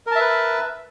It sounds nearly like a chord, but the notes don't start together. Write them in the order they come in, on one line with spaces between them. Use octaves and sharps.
A#4 A5 E5 B4